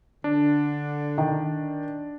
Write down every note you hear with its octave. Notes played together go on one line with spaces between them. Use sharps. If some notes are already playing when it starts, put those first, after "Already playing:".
D3 D4
D#3